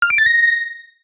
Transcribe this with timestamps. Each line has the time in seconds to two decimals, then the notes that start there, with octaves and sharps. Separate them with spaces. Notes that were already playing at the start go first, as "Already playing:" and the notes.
0.02 F6
0.10 D7
0.18 A6
0.26 A#6